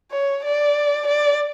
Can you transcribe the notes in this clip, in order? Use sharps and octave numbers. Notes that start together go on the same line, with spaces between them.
C#5
D5
D5